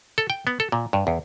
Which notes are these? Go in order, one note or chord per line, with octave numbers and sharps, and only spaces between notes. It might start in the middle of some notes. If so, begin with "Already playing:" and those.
A4
G5
B3
A4
A#2
G2
E2